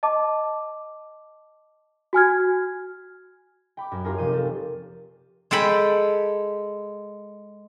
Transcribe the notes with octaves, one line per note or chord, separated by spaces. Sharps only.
D#5 A5 D6
F#4 G#5 F6 G#6
G5 B5 D6
F#2
D#4 F4 G4 G#4 A#4 C#5
F1 G4 F5 G6 D#7
A#3 A4
G#3 A4 G5 B5